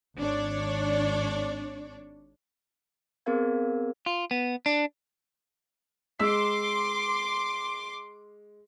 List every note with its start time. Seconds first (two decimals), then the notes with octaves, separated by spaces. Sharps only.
0.18 G#1 D4 C#5 D5
3.26 B3 C4 G#4 A#4 F5 G#6
4.06 F4
4.31 B3
4.66 D4
6.19 G#3 C6 D6 E6 B6